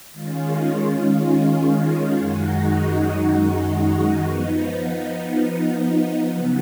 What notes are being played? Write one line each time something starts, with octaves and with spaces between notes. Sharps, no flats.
D#3 G#3 C#4 F4
F#2 D#3 G#3 D#4 F#4
F3 B3 D#4
C#3 F#3 B3